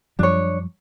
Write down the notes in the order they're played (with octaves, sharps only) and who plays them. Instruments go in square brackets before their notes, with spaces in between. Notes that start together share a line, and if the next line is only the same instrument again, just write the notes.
[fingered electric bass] F#2 F3 G3 [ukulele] D4 C#5